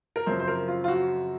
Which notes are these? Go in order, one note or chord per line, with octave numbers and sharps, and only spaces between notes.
A#4
F#2 C#3 F3 C4 C5
C5
A#4
F4
F4
F#4